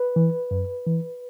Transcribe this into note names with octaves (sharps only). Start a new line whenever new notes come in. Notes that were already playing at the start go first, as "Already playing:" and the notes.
Already playing: B4
E3
F#2
E3